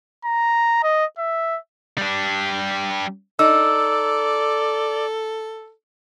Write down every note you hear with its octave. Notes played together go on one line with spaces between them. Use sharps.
A#5
D#5
E5
G3 D4
D#4 A4 D5 E6